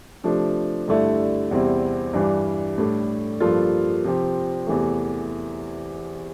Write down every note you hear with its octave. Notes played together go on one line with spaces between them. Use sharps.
C3 F3 A3 D4
G2 D3 A3 E4
E2 C3 G3 C4 E4
G2 E3 G3 D4
A2 G3 D4 A4
G2 F3 A#3 F4 A4
C3 F3 C4 G4
E2 C3 E3 A3